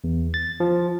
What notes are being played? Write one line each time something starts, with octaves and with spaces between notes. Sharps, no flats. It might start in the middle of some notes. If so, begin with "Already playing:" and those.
E2
A6
F3